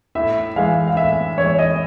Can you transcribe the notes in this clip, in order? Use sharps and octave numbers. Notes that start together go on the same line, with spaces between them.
A2 E5
E3 G#3 F5
F5
A2 E5
E3 G#3 C#5
D#5